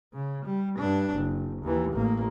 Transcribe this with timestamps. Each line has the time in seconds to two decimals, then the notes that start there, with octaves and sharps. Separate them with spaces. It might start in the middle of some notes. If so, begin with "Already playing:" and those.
0.13 C#3
0.45 G3
0.79 G2 D4
1.14 F#1
1.62 D#2 E3
1.93 A1 A#3